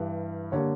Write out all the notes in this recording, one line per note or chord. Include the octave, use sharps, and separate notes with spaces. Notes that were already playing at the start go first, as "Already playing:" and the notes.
Already playing: G2 E3 G3
D3 G3 A#3 C#5